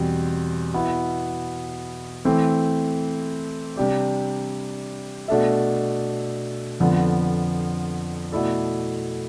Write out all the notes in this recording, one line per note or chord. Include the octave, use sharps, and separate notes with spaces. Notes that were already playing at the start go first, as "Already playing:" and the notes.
Already playing: E2 B2 G3 C4
B2 B3 E4
E3 A3 C4
C3 G3 D4 G4 D5
B2 A3 D4 A4 E5
F2 D3 F3 B3
B2 A3 E4 A4 D5